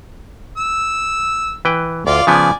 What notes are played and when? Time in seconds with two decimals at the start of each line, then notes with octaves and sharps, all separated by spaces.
0.58 E6
1.65 E3 B4 G5
2.07 D2 F4 D5 F5
2.27 C#3 F3 B3 D5 G#5